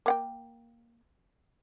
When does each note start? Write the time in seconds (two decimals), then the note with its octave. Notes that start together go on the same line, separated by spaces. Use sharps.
0.06 A#3 F#5 G5